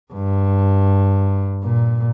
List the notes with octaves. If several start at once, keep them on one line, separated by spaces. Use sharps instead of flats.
G2
A#2